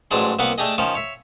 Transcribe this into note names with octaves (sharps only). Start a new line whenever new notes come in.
A1 G#2 F#3 D4 G#4 C6
C2 A#3 B3 B4 F#5
A3 D4 G4 G#4 D#5
D#3 F3 C#4
C#5 E5